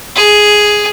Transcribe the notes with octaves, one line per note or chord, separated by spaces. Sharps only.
G#4